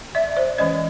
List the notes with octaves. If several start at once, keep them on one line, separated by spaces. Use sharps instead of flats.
D5 E5
C5 D5
E3 G#3 C#4 C#5 D#5